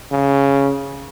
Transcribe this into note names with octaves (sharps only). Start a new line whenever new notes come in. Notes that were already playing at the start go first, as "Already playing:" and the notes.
C#3